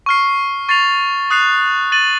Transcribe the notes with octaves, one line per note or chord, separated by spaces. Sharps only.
C#6 F6 C7
C#6 A6 C7 F7
D#6 F#6 C7 F7
A6 D#7 F#7